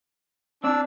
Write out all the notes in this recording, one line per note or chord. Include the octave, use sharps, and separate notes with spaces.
C4 D4 D5 E6